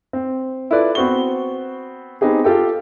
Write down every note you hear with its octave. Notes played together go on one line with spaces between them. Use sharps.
C4
E4 F4 A4 B4 D5
B3 C4 F#4 C#6 G7
B3 C4 D#4 G4 G#4
F4 G4 A4 G5